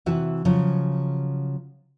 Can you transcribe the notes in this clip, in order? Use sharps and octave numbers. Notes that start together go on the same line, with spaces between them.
C3 E3 F#4 B4 E5
C#3 F3 F#3